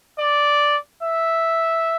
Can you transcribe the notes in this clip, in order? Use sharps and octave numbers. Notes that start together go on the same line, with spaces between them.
D5
E5